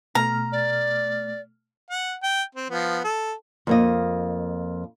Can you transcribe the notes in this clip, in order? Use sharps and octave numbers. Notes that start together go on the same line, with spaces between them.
B2 A3 A#5 F6
D5
F#5
G5
C4
F3 B3
A4
F2 A#3 D#5